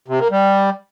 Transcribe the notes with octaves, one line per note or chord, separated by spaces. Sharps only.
C3
A#3
G3